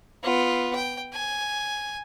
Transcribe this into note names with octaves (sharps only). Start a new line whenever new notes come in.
B3 F4
G5
G#5